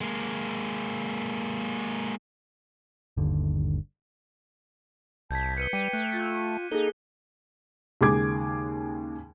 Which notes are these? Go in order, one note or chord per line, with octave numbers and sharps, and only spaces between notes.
G#3 A#3
G1 D#2 D3
C2 A5 G6 G#6 B6
B4 C#7 D#7 G7
G3 G5 D6 G6 D#7
A3 F#6 G6
F4
A#3 D#4 G#4 A4 G7
D#2 C#3 G#3 G#4 D6 G#6